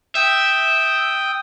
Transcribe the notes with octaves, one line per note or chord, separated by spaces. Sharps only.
E5 G5 D#6